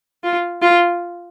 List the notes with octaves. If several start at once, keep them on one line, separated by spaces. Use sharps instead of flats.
F4
F4